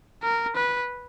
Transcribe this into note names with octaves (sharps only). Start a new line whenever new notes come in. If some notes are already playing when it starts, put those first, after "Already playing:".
A#4
B4